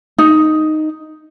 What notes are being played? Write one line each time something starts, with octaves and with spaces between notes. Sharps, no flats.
D#4